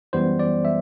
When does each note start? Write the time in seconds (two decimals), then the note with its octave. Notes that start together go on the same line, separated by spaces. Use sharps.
0.13 F#2 E3 G3 B3 C5
0.39 D5
0.65 E5